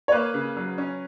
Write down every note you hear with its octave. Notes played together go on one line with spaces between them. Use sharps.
C#5
A#3 B4
C#3
F#3
C#4